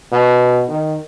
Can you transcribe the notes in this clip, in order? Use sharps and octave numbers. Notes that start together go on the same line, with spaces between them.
B2
D#3